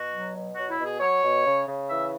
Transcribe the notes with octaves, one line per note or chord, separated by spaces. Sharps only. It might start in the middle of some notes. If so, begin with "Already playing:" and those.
Already playing: B2 F#4
F#3
B2
F#3 F#4
E4
B2
G#4
F#3 C#5
B2
C#3
C#3
E3 E5